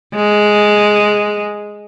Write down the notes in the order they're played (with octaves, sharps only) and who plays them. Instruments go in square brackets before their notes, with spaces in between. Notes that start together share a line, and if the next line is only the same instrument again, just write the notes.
[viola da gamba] G#3